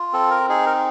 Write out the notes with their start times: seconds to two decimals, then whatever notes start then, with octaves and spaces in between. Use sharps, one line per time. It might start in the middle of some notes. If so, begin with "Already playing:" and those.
Already playing: F4
0.13 C4 A4
0.31 A#4
0.49 D#4 G#4
0.66 A#4